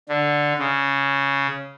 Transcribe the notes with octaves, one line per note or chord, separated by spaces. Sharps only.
D3
C#3